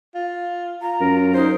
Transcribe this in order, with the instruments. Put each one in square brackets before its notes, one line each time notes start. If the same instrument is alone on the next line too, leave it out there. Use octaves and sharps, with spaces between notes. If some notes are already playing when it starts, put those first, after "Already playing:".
[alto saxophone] F4
[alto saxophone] F4 [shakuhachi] A#5
[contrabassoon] F#2 [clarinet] A#4
[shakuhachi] D#4 [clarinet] C5